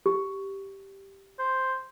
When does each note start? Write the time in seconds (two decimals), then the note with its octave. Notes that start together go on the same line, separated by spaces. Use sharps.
0.06 G4
1.39 C5